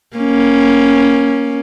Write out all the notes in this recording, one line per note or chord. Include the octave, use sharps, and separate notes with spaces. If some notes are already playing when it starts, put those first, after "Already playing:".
A#3 C#4